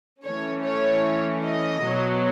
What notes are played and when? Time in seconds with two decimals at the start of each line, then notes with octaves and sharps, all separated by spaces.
0.23 E3 A3 C#4 C#5
0.63 C#5
1.44 D#5
1.85 B2 F#3 B3